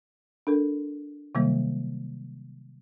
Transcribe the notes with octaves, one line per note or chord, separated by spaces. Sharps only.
D4 A4 A#4
C3 D#3 F#3 G3 A#3